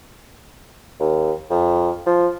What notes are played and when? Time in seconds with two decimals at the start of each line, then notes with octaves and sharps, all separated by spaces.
1.00 D#2
1.50 F2
2.06 F3